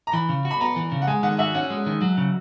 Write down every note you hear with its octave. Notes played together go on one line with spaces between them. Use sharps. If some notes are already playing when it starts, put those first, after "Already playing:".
A#5
E3 B5
C#3
F#4
B5
B3 A#5
E3
C#3
F#5
G#3 G#5
D#3 F#5
F#4 E5
C#4 F#5
G#3
D#3
F#3
C#3